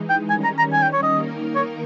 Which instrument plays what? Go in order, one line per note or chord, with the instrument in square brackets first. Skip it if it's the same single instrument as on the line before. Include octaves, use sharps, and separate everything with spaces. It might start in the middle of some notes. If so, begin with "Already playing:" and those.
Already playing: [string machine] E3 G#3 D#4
[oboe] G5
[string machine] D#3 G3 C#4 [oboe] G#5
[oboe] A#5
A#5
G#5
G5
C#5
D#5
[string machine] D#3 A#3 D#4 A#4
[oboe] C#5